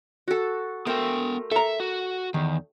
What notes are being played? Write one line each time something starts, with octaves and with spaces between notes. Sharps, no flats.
F#4 A4
A3 B3 A#4 C5 G5
A4 E5 A#5
F#4
E2 D#3